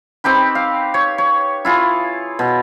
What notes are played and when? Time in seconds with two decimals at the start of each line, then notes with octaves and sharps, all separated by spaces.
0.24 C4 D#4 G4 B4
0.55 F5
0.94 C#5
1.18 C#5
1.65 E4 F4 G#4
2.39 B2